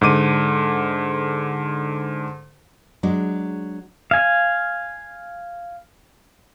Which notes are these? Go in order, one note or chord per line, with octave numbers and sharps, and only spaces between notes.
G#2 D3 D6 D#7
F#3 G#3 D4
F5 G#5